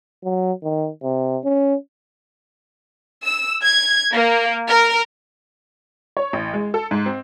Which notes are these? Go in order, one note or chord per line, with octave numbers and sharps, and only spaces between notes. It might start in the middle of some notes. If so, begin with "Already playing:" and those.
F#3
D#3
C3
C#4
E6
G#6
A#3
A#4
C#5
A1
G#3
A4
G#2
C4